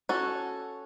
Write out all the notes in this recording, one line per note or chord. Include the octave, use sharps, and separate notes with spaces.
C#4 F#4 A4